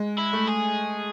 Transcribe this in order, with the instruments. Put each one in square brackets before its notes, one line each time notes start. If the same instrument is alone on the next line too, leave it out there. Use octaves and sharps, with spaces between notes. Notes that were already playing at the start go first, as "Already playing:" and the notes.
Already playing: [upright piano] G#3
[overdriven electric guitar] E4
[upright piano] A3
[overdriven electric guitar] G#4